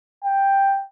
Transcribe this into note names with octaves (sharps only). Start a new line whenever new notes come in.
G5